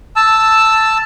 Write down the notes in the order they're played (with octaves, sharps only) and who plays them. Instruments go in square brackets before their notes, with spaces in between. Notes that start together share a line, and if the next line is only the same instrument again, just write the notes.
[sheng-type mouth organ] A5 E6